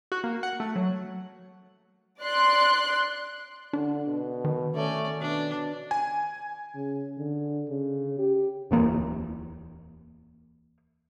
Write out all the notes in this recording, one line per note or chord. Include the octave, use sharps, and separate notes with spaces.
F#4
A#3
F#5
A3
F#3
D5 C6 F#6
D3 D4
B2
D#3
A3 C#4 D5
B2 D4
G#5
C#3
D3
C#3
G4
D1 E2 A#3